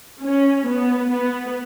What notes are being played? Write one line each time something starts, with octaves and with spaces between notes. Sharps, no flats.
C#4
B3
B3